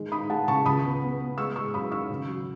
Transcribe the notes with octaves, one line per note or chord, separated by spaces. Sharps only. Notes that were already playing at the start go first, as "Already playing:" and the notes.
Already playing: D#3 G#3
D#4 B5 D#6
G#3 F#5 A5
C#3 A5 C#6
C#2 B5 D#6
B3
B3
B3
G#3 C#6 E6
G#3 C#6 E6
F#2 B5 D#6
D#3 C#6 E6
C#3
F#3